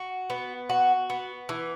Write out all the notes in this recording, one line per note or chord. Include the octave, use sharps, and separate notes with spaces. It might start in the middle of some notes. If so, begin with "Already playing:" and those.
Already playing: F#4
B3
F#4
B3
E3